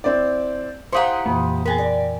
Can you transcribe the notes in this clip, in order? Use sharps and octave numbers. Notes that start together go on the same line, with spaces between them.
C4 E4 D5
E4 G4 C5 F5 F#5 A#5 C6 D#6
F2 A#2 E3 A#3
B3 G#4 A#4 G5 G#5
D5